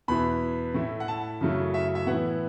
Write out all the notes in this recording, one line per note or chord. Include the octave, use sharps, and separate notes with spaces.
E2 B2 B3 E4 B5
A2 A3 E4
F#5
A5
F#2 C#3 F#3 A3 E4
E5
E5
A2 E3 B3 E4 F#5